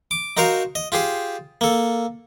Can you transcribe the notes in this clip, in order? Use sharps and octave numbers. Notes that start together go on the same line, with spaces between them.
D6
D#4 F#4 A#4 C5 F5
D#5
F4 G4 G#4 C5
A#3 A4